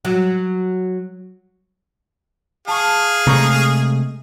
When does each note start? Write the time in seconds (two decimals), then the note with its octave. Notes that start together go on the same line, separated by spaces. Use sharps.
0.05 F#3
2.68 G#4 F5 A5 C#6
3.27 C3 G#3 A3 A#5 C#6 G6